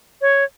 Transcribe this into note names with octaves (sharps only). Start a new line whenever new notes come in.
C#5